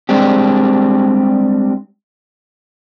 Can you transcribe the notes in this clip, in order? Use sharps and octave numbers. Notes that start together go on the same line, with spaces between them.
G3 G#3 C4 D4 G4